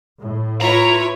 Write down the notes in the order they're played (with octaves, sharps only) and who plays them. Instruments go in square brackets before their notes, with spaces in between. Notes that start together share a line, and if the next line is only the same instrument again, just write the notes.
[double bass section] A2
[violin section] E4 B4 C#5 [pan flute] F4 [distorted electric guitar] A#5